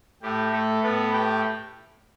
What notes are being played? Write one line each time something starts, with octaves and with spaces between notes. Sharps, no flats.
A2 A3 G4
A3 A4
A2 A3 B3 B4
G4 G5